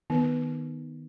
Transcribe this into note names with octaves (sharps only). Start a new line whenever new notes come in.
D#3 B3 B4